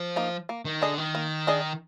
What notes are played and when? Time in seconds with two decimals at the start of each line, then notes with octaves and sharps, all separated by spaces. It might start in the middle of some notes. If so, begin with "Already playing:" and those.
Already playing: F3
0.16 A#3 D#4
0.49 A#3
0.65 D#3
0.82 D3 D4 G#4 D#5
0.98 D#3
1.15 A#3
1.47 D4 G#4 D#5